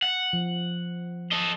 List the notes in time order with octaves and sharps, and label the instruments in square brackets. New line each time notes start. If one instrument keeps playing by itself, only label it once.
[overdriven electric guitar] F#5
[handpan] F3
[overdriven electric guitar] A4 D#5